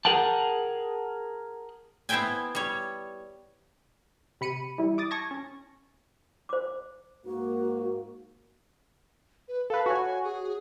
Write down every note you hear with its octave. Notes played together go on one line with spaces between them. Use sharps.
G#4 A#4 F#5 G5 A5
B3 E4 C5 E5 G5 G#5
G3 C#5
C3 B5 C#7 D#7
E3 G3 E4
D6 D#6 A6
A5 C#6 G#6 A#6
C#4
C5 D6
G#2 A#3 F#4
B4
A4 B4 F5
F#4 C#5 G#5
G#4